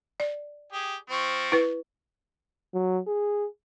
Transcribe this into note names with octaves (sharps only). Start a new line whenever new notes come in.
D5
G4 G#4
F3 C4 C#6
E4 B4
F#3
G#4